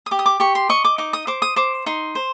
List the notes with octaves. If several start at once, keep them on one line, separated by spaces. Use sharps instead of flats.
D#6
G4 D6
D#6
D6
G4 C#6
C6
D#5 C#6
D6
D#4 D6
D#6
C5 D6
D#6
C5 D6
D#4 C6
C5